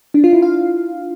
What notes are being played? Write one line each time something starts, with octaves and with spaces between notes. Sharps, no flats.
D4
F4
E4
F5